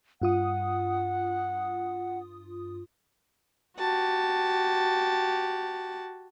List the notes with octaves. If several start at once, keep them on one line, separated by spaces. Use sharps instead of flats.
G2 F4 F#5 D#6
F#4 G4 A5